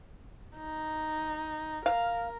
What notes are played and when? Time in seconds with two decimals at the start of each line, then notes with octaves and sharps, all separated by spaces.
0.58 D#4
1.86 A#4 F5